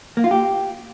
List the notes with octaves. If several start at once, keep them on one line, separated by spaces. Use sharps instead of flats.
A#3
F4
G4